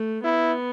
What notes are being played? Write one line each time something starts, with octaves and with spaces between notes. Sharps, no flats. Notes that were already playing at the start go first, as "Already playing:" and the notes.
Already playing: A3
B3 E4